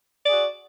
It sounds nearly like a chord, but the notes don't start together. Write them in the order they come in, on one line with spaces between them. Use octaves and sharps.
D5 G#4 F#4